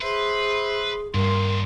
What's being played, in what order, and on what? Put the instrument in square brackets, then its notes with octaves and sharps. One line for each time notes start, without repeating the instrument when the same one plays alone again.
[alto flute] G#4 [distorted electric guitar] B4 [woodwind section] C5 E5 C6
[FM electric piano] G2 [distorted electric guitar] A#2 D#3 [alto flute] A#4 [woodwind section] C6